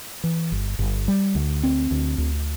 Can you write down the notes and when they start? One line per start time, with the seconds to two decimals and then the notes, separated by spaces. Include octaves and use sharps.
0.24 E3
0.52 G1
0.79 G1
1.08 G3
1.35 D2
1.64 C4
1.91 D2
2.18 D2